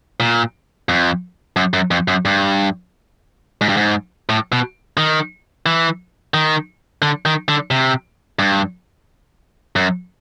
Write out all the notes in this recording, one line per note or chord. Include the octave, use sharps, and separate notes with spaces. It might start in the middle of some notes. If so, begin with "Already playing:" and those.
A#2
F2
F#2
F#2
F2
F#2
G2
G#2
G2
G#2
A2
B2
D#3
E3
D#3
D3
D#3
D3
C3
G2
F#2